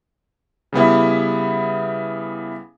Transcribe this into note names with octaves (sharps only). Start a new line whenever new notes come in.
C#3 G3 B3 E4